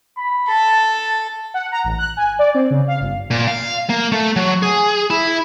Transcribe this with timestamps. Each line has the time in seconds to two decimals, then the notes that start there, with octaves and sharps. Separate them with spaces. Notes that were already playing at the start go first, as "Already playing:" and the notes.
0.17 B5
0.48 A4 A5
1.54 F#5
1.72 A#5
1.84 A1
1.98 F#6
2.17 G#5
2.39 D5
2.54 C4
2.70 C#3
2.88 F5
3.00 G1
3.31 A#2
3.47 F5
3.90 A#3
4.12 A3
4.36 F#3
4.63 G#4
5.10 E4